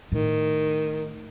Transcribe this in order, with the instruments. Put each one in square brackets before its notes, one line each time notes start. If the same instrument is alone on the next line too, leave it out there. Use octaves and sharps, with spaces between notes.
[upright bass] A2 [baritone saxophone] D#3